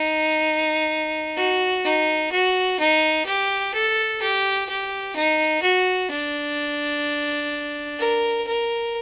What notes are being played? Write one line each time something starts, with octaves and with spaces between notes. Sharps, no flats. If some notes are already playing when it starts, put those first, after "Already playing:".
Already playing: D#4
F#4
D#4
F#4
D#4
G4
A4
G4
G4
D#4
F#4
D4
A#4
A#4